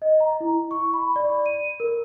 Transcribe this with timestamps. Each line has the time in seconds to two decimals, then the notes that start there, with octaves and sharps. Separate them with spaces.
0.02 D#5
0.20 A#5
0.40 E4
0.71 C#6
0.94 B5
1.16 D5
1.46 D#7
1.80 A#4